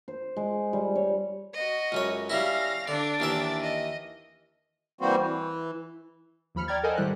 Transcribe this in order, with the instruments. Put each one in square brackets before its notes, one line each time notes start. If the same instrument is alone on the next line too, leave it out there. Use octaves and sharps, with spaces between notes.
[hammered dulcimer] C5
G#3
G3
C#5
[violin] F#4 D#5
[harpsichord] C#2 F#2 C#5
[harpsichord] C#3 G3 E4 [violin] F5 A#6
[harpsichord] D3 [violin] D4 D5
[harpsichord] D#2 E3 E5
[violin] D#5
[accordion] E3 G3 A#3 C4 F#4 C5
E3
[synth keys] D#2 F3 B5 F6 C#7
D5 G5 A#5 F6 G#6 A6
A4 A#4 C5 D#5 F#5 G#5
G#2 D#3 G3 E4 F#6